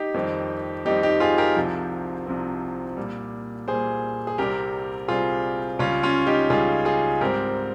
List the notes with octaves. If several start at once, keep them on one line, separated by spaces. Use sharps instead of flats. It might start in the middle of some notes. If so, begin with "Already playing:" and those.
Already playing: D#4 G4
F2 D#3 G3 C4
F2 D#3 G3 C4 D#4 G4
D#4 G4
F4 G#4
G4 A#4
C2 C3 F3 C4
C2 C3 F3 C4
A#2 G3 A#3
A#2 G3 A#3 G#4 C5
G#4
C2 C3 G3 C4 G4 A#4
C2 C3 G3 C4 F4 G#4
C#2 C#3 G3 C#4 F4
C#4 F4
D#4 G4
C#2 C#3 G3 F4 G#4
F4 G#4
G#2 G3 C4 G4 A#4